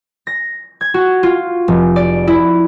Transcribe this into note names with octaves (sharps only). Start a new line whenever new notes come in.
A#6
G#6
F#4
F4
F1
D5
E4